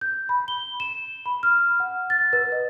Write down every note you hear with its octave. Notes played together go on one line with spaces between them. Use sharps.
G6
B5
G7
E7
B5
F6
F#5
A6
B4
D#5